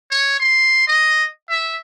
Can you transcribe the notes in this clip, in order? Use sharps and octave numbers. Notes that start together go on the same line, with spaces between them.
C#5
C6
D#5
E5